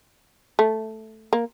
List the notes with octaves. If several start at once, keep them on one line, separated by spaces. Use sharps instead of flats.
A3
A#3